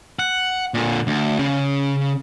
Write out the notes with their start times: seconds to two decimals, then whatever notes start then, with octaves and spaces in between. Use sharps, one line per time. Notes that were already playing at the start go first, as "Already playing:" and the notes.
0.19 F#5
0.74 A#2 D3
1.07 D2
1.39 C#3